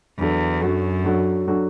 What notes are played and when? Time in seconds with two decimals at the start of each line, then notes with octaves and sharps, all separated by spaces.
0.18 E2 F#3 D4 F#4 A4
0.61 F#2 F#3 D4 F#4 A4
1.04 F#3 D4 F#4 A4
1.47 F#3 D4 F#4 A4